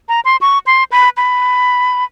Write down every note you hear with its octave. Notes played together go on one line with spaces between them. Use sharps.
A#5
C6
C#6
C6
B5
B5